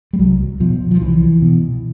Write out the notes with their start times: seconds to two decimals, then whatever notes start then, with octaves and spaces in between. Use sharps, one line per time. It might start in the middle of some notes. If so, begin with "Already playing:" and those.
0.13 G3
0.19 C2 F#3
0.60 B2 F3
0.91 F3
1.00 C2 E3
1.42 B2